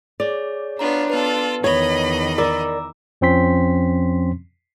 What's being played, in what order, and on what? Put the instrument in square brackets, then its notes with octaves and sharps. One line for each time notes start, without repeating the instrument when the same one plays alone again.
[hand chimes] G#4 C#5 [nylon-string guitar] D5
[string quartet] B3 F4 [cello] D4 [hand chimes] C#5 A#5
[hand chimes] B3 B4 [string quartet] F4 A4
[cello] E2 D#3 [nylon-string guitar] C#5 [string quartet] D#5 B5
[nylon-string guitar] A#4 D5 [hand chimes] A#5 D6 E6
[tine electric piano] F2 F3 C4 C#4 C6 B6